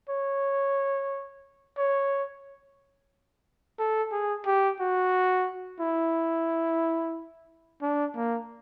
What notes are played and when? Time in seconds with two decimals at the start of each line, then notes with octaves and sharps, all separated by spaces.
0.09 C#5
1.78 C#5
3.79 A4
4.12 G#4
4.46 G4
4.80 F#4
5.80 E4
7.82 D4
8.15 A#3